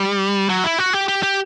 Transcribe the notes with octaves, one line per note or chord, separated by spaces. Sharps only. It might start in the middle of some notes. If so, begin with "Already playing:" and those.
Already playing: G3
F#3
E4
F#4
G4
G4
G4